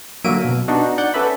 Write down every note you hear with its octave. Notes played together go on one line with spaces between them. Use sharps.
D3 F#3 A#3 E5 D7 D#7
B2
B3 D4 D#4 F#4
D5 F#5 G6
C#4 A4 B4 D5 E5 B5